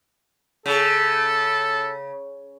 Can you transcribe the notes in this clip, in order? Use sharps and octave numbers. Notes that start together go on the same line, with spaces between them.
C#3 A4